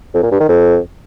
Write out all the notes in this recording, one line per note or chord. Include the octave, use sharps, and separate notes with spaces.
F2
A#2
G2
D#3
F2